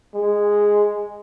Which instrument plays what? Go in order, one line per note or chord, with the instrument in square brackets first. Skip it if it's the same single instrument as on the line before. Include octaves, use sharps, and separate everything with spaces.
[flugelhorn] G#3